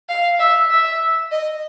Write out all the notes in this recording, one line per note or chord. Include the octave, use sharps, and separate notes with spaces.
F5
E5
E5
D#5